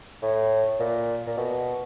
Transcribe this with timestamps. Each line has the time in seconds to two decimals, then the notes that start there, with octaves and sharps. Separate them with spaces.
0.22 A2
0.80 A#2
1.27 A#2
1.37 B2